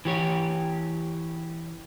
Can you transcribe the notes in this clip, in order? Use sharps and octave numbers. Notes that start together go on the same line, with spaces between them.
E3 G4 C#5